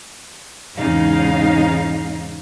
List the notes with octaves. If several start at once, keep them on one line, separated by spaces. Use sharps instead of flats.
E2 G#2 C#3 D#4 F5